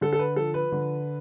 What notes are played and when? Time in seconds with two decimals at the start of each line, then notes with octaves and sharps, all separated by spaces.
0.01 D3 A4
0.13 A4
0.19 B4
0.36 F3 A4
0.54 B4
0.72 D3